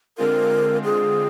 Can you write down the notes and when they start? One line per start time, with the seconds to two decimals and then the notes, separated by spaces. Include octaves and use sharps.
0.18 D3 G#3 C4 F4 A#4
0.84 G#4